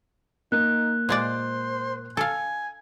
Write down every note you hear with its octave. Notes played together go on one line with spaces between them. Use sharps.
A#3 D#4 F#6
A#2 G#3 C5 D5
A4 F5 G#5